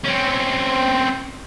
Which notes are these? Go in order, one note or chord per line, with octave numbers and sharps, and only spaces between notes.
C4 C#4